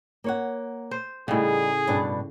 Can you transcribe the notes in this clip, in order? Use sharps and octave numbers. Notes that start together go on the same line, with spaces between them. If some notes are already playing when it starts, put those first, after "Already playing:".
A#3 C#5 F#5
C5
A2 C#3 G3 D#4 G#4
G2 B2 D4